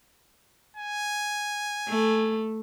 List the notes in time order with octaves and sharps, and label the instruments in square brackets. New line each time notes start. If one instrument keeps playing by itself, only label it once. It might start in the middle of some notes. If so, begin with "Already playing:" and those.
[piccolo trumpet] G#5
[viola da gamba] A3